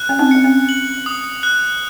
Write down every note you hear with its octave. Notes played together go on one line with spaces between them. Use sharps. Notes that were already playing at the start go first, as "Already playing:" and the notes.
Already playing: F#6
C#4
C4 D#4
C4 C#7
C#4
F#7
D#6
F#6